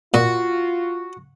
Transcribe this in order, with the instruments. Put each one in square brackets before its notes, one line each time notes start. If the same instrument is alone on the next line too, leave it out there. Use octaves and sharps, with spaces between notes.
[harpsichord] A#2 [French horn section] F4 [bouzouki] F#4